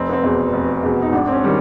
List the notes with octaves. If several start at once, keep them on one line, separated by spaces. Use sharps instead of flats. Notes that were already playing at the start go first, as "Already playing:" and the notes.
Already playing: F1 C4
B3
C4
E2 B2
F1
E2 B2
D#4
G#1 D4
C4
C#4
D#3 G3